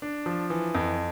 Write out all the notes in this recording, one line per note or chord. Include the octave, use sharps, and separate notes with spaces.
D4
F3
E3
F2